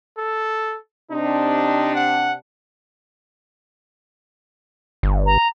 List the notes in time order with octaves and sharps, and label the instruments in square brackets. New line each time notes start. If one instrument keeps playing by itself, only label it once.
[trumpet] A4
[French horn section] C3 C4 D4 [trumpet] D#4
[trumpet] F#5
[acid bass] G1
[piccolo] A#5